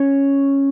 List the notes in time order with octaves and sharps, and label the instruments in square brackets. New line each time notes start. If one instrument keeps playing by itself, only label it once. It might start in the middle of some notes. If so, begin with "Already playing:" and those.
Already playing: [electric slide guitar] C#4 C#5